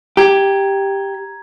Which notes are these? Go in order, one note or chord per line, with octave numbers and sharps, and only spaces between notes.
G4 A#5 G#6